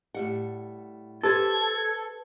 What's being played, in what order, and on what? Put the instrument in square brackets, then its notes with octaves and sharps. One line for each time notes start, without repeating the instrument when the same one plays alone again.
[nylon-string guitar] A2 G3 F#5
[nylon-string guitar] G4 B4 C5 [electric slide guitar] A4 [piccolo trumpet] G#6